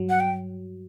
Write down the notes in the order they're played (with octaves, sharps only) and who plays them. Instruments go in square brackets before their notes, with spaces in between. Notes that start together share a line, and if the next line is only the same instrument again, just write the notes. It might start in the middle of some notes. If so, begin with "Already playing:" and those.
Already playing: [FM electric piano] G2 F#3
[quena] F#5
G5